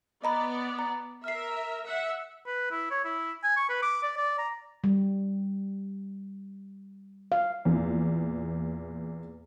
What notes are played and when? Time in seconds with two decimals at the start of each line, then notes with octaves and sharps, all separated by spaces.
0.24 B3 D5 D#5 A#5 B5
0.79 A#5
1.24 A#4 E5 F6 C7
1.85 E5 F#5
2.47 B4
2.71 E4
2.91 C#5
3.05 E4
3.44 G#5
3.57 C#6
3.69 B4
3.82 D6
4.03 D5
4.18 D5
4.38 A#5
4.84 G3
7.32 F5
7.65 E2 A#2